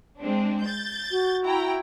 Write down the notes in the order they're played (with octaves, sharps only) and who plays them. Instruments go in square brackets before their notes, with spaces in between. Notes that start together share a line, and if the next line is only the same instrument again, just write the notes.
[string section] G#3 C4 D4
G6 A6
[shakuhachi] F#4
[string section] E4 G5 A#5